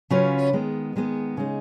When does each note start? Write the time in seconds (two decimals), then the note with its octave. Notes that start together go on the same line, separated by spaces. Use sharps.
0.10 C#3 F#3 C#4 F4 B4
0.53 D#3 G#3 B3
0.96 D#3 G#3 B3
1.37 C#3 G#3 D#4